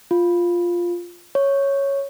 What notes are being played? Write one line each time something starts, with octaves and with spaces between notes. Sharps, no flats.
F4
C#5